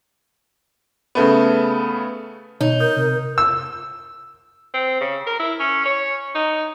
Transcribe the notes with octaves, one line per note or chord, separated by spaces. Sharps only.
C#3 A3 B3
B2 D#4 C#5
A#4 D#6 G6
C3
E6
C4
C#3
A#4
E4
C#4
C#5
D#4